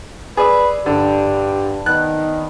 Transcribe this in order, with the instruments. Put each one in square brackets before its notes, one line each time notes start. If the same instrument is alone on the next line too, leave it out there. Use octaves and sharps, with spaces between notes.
[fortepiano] G#4 [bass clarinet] B4 [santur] D5 E6
[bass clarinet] G2 [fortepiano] D3 [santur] D4 A5 B5 [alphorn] G4
[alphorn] D#3 [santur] B3 [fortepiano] F#6